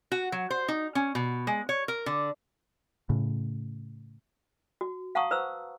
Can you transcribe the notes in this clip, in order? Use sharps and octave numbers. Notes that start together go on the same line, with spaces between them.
F#4
F#3
C5
D#4
C#4
B2
G#3
C#5
A#4
D3
A2 C#3
F#4
F5 F#5 A5 A#5 C#6 D#6
B4 C5 A#5 E6